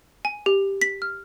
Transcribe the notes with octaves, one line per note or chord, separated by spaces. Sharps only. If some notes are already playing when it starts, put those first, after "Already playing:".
G#5
G4
B6
F6